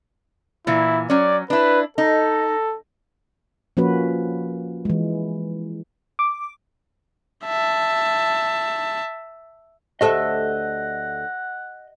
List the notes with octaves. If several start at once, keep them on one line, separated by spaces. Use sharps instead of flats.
A#2 E3 E4
F#3 C#4 D5
D4 E4 B4
D#4 A4
F3 A#3 C#4 F#4 B4
E3 G#3
D6
E5 A5
D2 G4 A4 C5 D#5 E5 F#5 A5